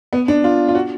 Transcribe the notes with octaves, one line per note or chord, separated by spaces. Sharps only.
B3
D4
F4
F4
F#4